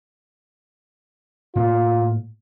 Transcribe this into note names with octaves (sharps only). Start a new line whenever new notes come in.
A2 A#3 F4